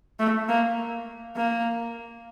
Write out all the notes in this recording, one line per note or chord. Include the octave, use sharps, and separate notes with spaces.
A3
A#3
A#3